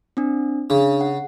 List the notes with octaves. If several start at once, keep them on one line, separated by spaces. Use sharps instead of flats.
C4 D4
C#3 D4
F#5